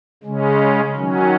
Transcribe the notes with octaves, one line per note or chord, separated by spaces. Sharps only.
C#3 G#3 C#4
D#3 F#3 C#4